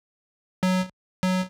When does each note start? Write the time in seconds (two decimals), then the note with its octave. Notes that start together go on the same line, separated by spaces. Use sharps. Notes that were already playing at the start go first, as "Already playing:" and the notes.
0.63 F#3
1.23 F#3